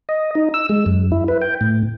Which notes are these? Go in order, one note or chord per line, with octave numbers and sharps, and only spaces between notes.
D#5
D#4
E6
G#3
F#2
E4
B4
G5
A2